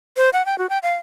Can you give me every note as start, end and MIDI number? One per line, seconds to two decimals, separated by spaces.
0.17 0.30 72
0.33 0.45 78
0.46 0.58 79
0.58 0.67 66
0.70 0.78 79
0.83 0.94 77